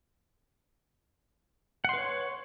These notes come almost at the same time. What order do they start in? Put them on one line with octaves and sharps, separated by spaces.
F#5 C6 B4 C#5